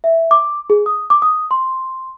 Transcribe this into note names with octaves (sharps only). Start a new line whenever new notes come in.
E5
D6
G#4
D#6
D6
D#6
C6